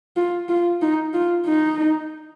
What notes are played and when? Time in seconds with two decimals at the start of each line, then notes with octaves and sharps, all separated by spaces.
0.16 F4
0.49 F4
0.82 D#4
1.14 F4
1.47 D#4